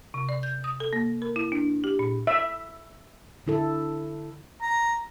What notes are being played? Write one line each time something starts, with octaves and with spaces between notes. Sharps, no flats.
C3
D5
G6
D#6
A4
A#3
A#4
E4
D4
G4
A#2
E5
D3 E4 A4
A#5